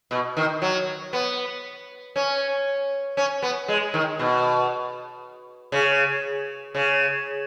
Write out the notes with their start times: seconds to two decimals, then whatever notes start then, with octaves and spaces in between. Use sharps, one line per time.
0.11 B2
0.37 D#3
0.62 F#3
1.13 B3
2.16 C#4
3.17 C#4
3.42 B3
3.68 G#3
3.94 D#3
4.19 B2
5.72 C#3
6.75 C#3